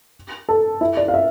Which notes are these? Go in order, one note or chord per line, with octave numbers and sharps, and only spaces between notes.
A4
E4
D5
F5
E5